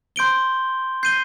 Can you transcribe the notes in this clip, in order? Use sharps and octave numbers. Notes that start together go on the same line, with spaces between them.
C6 G6 D7 G7
G6 C7 D#7 G7